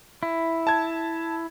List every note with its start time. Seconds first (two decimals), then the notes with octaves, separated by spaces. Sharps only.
0.23 E4
0.67 A5 G#6